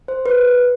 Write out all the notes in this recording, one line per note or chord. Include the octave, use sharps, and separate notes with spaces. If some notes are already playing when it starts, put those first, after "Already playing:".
C5
B4